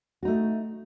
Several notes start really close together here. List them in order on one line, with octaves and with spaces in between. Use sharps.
F#4 D#4 A3